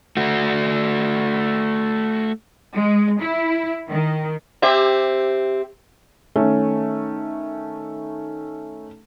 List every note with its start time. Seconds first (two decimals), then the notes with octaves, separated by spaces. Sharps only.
0.17 A3 F#4
2.74 G#3
3.21 E4
3.88 D#3
4.62 C4 G4 E5
6.36 D#3 A3 C#4